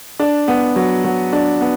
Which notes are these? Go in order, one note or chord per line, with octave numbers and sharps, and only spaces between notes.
D4
B3
F#3
F#3
D4
B3